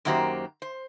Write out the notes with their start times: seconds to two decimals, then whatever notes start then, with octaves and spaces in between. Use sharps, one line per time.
0.05 F#2 D#3 A#3 F#4 G4 C5
0.62 C5